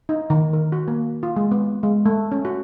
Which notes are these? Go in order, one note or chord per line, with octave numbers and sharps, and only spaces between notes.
D#4
D#3
A#4
F#4
A#3
F4
G#3
B3
G#3
A3
C#4
F#4